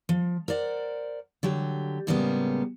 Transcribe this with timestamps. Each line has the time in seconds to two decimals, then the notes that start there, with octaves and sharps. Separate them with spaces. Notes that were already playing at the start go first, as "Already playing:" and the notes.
0.09 F3
0.48 A#4 C5 D5 F#5
1.43 D3 F#3 G4
2.07 A2 C#3 G3 G#3 A#3 B3